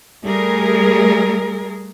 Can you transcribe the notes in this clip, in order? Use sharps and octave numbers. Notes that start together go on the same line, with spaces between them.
G3 A3 G#4 A#4